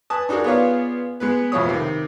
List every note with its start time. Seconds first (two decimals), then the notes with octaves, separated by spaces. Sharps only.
0.10 B4 G#5 A5 D#6
0.29 D4 D#4 F#4 G#4 A#4
0.44 B3 F4 G#4 C#5 D5 F5
1.20 G#3 B3 B4
1.52 A1 F2 B2 F3 C#5 D#6
1.69 C3 D#3